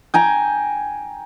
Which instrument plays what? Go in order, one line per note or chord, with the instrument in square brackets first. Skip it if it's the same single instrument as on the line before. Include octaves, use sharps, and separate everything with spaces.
[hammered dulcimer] G5 G#5 A#5